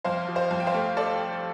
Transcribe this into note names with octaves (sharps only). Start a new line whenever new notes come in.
F2 C5 F5
F3
C5 F5
F2
G5
C5 F5
A3
A4 D5